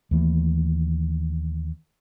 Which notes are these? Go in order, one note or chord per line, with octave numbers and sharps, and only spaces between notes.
D#2 E3 A3